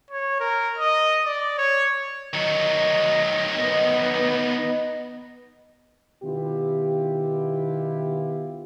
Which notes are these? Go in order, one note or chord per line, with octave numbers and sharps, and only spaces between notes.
C#5
A#4
D#5
D5
C#5
D#3 F#3 D#5
B3
B2 D#3 B3 E4 F4 G4